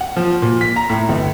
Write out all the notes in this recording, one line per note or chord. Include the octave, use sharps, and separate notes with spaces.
F#5
F3
A#2
B6
A#5
A2
G1